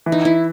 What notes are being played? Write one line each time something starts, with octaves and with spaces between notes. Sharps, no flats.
E3
D#4
E4